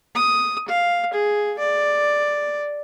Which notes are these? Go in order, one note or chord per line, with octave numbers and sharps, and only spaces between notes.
D#6
F5
G#4
D5